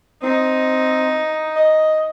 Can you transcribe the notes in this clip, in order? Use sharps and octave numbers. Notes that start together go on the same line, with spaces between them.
C4 D#4
D#5